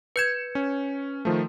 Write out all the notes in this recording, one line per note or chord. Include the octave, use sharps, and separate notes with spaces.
B4 G6 G#6 C#7 E7
C#4
D#3 F3 A3